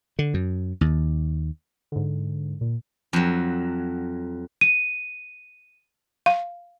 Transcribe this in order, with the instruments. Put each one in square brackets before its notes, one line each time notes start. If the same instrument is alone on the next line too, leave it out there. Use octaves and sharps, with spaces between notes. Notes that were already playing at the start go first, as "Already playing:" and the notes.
[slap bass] D3
F#2
D#2
[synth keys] G#2 D3
A#2
[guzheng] F2 F#3
[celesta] D#7
[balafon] F5